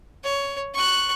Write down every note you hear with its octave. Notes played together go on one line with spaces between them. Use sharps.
C#5
C#6 F#6